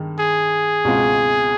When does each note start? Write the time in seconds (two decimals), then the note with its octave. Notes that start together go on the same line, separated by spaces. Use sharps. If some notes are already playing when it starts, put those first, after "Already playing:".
Already playing: G2 D#3 G#3
0.19 G#4
0.85 C#2 B2 G#3 C4 F4